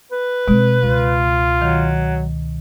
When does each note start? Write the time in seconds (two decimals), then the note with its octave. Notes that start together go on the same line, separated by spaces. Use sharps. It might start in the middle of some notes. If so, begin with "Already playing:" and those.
0.12 B4
0.48 B2 G#3 C4
0.83 C#2 F4
1.61 D#3 F#3